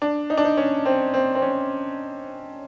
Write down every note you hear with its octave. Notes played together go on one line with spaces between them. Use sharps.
D4
D#4
D4
D#4
C#4
C4
C4
C4
C#4